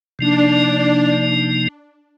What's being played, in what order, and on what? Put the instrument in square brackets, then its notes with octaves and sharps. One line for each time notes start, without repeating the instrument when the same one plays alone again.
[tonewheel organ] C3 F3 A#3 D#4 [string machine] D4